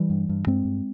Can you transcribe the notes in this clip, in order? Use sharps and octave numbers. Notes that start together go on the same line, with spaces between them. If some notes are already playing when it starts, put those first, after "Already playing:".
Already playing: E3 G3
G2
G2
G2 G#3 C4
G2